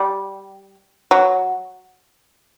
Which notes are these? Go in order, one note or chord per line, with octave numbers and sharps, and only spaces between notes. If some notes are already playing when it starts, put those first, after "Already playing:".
Already playing: G3
F#3